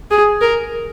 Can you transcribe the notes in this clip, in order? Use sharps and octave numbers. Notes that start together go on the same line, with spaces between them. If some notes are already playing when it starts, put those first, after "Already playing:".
G#4
A#4